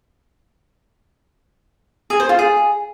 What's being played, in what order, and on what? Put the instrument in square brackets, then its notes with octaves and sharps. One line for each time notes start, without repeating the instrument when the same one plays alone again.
[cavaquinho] G#4
C5
F4
G#4